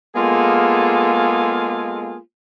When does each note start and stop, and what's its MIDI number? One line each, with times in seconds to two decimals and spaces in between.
0.16 2.17 56
0.16 2.17 58
0.16 2.17 59
0.16 2.17 65
0.16 2.17 68
0.16 2.17 69